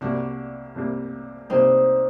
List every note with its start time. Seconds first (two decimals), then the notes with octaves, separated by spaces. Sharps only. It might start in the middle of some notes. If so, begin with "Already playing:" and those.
0.01 C2 C3 G3 A#3 D4 F#4
0.76 C2 C3 G3 A#3
1.50 C2 C3 G3 A#3 C4 D#4